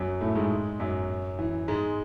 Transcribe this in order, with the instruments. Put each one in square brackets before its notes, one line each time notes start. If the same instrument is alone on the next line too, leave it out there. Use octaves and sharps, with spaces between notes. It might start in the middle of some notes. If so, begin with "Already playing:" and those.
Already playing: [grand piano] F#2 F#3
A2 A3
G#2 G#3
F#2 F#3
E3
G#2 G#3